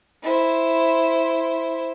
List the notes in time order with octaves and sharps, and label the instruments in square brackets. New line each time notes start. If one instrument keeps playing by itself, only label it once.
[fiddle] E4 C5